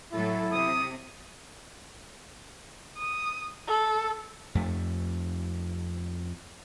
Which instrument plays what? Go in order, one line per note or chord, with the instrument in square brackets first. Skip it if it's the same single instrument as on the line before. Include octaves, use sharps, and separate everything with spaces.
[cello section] A2 F#3 A4 [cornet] E4
[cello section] C3 [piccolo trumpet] D#6
[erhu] D#6
A4
[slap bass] F2 A3